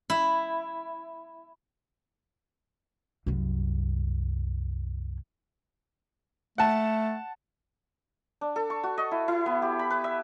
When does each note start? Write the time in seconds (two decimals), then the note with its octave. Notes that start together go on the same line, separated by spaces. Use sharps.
0.10 E4
3.26 C2 F#2
6.58 A3 F#5 A5
8.41 D4
8.56 A4
8.70 C#6
8.83 F#4
8.98 D#5
9.11 E4
9.28 E4
9.46 B3
9.62 G4
9.79 B5
9.90 B4
10.04 E5